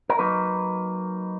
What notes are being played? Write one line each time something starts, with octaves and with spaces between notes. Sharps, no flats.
A#4
F#3 A#3 D#4 B4